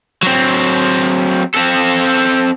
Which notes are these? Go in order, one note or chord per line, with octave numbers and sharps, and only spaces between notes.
F#3 C4
C4 A4